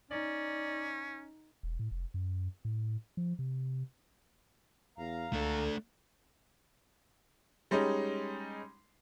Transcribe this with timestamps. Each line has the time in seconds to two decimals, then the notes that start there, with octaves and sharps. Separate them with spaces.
0.11 C#4 D#4 D5
1.63 E1
1.79 A2
1.91 F1
2.14 F#2
2.65 A2
3.17 F3
3.39 C3
4.98 E2 F5 A#5
5.33 C#2 A3 D4 A4
7.71 G3 G#3 C#4 D#4